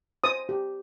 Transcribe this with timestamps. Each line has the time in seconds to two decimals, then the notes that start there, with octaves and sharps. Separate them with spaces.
0.24 C5 D#6
0.49 G4